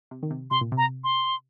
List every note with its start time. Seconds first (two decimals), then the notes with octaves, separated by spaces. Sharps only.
0.11 C3
0.23 D#3
0.31 C3
0.51 C3 C6
0.61 A#2
0.72 C3
0.77 A#5
1.04 C6